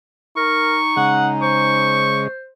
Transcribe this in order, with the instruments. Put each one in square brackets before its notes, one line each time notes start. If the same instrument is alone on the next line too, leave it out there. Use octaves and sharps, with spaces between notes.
[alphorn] D#4 [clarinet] A#4 [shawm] C#6
[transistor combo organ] C#3 G#3 [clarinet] F#5
[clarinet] C5 [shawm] C#6